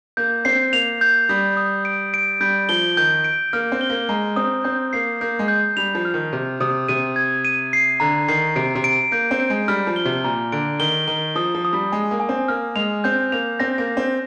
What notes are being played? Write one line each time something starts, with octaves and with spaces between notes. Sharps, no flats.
A#3 G6
C4 C7
A#3 F7
G6
G3 D#6
D#6
D7
D7
G3 G6
F3 G7
D#3 G6
D7
A#3 F6
C4
G7
A#3
G#3 A#5
C4 D#6
C4 G6
A#3 C7
A#3 G6
G#3
G6
G3 F7
F3
F6
D#3
C3 G6
C3 D#6
C3 D#7
G#6
D#7
C7
D3 A#5
D#3 C7
C3 D7
C3
D7
A#3 G6
C4
D7
G#3
G3 F6
F3
G7
C3
A#2 A#5
D3 D7
D#3 G7
D#3 G7
F3 D#6
F3
D#6
G3
G#3 G#5
A#3
G#5
C4
A#3 F6
G#3 F7
C4 G6
A#3 F7
C4 A#6
A#3
A#6
C4